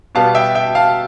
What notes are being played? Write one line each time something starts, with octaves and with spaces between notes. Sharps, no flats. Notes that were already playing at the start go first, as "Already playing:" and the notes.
B2 G3 B3 F5 A5
E5 G5
E5 G5
F5 A5